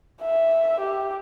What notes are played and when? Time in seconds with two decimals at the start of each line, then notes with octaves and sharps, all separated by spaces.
0.21 E5
0.80 G4